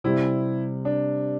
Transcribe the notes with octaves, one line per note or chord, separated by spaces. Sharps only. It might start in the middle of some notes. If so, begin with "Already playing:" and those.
C3 G3 C4 E4 G4
D4